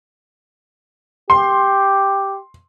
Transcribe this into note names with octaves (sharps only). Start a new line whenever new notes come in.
G4 C6